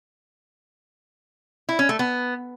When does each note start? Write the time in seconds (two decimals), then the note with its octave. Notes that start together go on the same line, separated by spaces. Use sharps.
1.69 E4
1.79 C#4
1.89 A3
1.99 B3